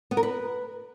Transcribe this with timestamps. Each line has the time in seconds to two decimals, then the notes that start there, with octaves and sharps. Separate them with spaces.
0.11 B3
0.17 A#4
0.23 B4